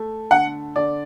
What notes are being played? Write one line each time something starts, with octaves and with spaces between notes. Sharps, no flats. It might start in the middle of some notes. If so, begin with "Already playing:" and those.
Already playing: A3
D3 F#5
D3 D5